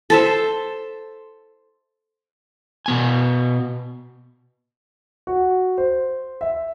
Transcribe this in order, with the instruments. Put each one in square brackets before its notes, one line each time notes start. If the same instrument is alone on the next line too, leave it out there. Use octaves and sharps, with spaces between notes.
[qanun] A4 C5 E5
[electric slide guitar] B2 B3 G#5
[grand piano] F#4
C5
E5